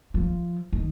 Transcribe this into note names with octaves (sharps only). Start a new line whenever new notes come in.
F3
D#3